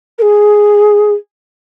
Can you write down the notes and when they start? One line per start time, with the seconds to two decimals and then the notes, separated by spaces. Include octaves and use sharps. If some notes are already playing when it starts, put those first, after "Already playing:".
0.18 A#4
0.22 G#4